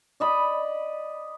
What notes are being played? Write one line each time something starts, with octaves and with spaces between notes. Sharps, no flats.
D5 D#5 B5